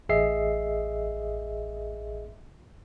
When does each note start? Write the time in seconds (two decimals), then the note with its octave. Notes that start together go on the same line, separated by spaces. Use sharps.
0.09 A1 G#4 D#5 E5 C7